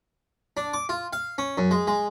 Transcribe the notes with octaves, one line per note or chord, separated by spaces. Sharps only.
D4
D6
F4
F5
C#4
F#2
G#3
G#3